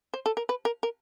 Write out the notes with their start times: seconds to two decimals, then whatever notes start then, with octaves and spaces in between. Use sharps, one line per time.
0.14 C5
0.26 A4
0.37 A#4
0.49 B4
0.65 A#4
0.83 A#4